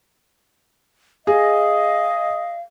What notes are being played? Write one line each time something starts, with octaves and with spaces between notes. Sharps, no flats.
G#4 D#5 F5